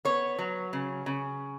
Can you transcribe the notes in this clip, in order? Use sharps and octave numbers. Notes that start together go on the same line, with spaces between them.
B3 C#5
F#3
C#3
C#3